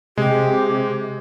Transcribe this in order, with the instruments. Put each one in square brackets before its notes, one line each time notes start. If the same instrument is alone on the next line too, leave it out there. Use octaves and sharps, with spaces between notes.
[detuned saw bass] C3 [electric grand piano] G#3 [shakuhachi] G4